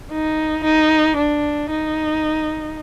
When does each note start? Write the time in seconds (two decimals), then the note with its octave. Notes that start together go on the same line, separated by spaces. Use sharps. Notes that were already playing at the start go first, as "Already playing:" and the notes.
0.12 D#4
0.64 D#4
1.17 D4
1.70 D#4